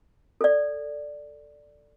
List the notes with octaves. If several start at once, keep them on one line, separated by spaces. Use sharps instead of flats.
A4 D5